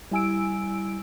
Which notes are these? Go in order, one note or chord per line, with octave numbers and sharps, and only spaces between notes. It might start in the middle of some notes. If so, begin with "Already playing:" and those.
G3 E4 G#5 E6 D7